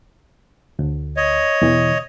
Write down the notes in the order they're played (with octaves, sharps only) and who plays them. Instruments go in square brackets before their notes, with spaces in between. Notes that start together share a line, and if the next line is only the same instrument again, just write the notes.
[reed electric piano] D2
[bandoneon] C#5 D#5
[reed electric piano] E2 B2 E3